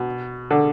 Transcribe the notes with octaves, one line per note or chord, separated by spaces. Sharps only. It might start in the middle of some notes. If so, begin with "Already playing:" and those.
Already playing: B2
D3